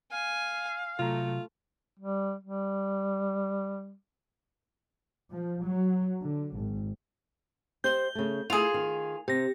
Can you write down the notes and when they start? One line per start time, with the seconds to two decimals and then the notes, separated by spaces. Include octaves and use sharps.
0.12 F5 G#5
0.99 C3 F#3 A3 F4 A#5
1.99 G3
2.43 G3
5.30 F3
5.65 F#3
6.22 D3
6.56 G#1
7.84 G4 C5 D#5 G6 G7
8.15 C#3 A3
8.50 A3 E4 F4 G#4 F7
8.74 D#3
9.28 C3 G4 A#6